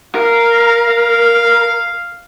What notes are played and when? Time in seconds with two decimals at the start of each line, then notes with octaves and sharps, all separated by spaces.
0.15 A#4 F5
0.89 F5